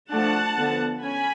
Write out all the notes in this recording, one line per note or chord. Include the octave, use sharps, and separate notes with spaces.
F3 A3 D4 F#5 A5
D3 F3 B3
C#4 G#5 B5